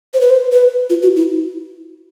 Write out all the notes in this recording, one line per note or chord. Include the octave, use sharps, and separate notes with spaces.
C5
B4
C5
B4
F4
F#4
E4